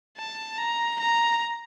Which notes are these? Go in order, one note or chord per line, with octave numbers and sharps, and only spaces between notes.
A5
A#5
A#5